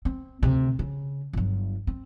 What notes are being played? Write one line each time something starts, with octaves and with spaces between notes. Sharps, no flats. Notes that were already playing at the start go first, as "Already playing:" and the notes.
C4
D2 C3
C#3
G1 F#3
C4